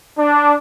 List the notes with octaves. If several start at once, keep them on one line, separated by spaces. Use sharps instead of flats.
D4